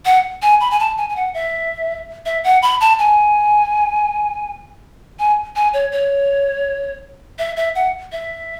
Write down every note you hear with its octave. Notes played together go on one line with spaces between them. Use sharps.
F#5
G#5
B5
G#5
A5
G#5
G#5
F#5
E5
E5
F#5
B5
A5
G#5
G#5
G#5
C#5
C#5
E5
E5
F#5
E5